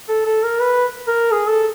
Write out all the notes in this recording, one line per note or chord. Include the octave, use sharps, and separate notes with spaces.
A4
A4
A#4
B4
A#4
G#4
A4